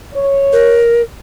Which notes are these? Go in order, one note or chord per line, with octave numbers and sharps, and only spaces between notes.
C#5
A#4